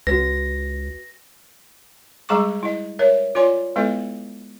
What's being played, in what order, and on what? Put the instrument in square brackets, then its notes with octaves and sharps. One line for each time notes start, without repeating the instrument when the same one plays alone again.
[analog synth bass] C#2 [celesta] F#4 B4 [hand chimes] A#6
[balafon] G3 G#3 G#4 A#5 C#6 D6
E4 D#5
A#4 C#5 E5
F4 C#5 D5 G#5 C6
G#3 B3 E4 A4 B4 D#5